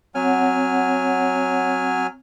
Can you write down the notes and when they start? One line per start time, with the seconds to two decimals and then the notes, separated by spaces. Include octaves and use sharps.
0.15 F#3 C4 C#5 F#5 G#5 F6